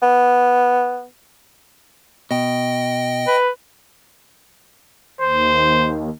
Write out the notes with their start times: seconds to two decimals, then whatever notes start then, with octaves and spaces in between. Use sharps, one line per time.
0.02 B3
2.31 B2 D#5 G5
3.27 B4
5.21 D#2 C5